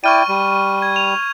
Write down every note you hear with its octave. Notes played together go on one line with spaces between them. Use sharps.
E4 D5 G5 C#6 F6 D#7
G3
G#6
F7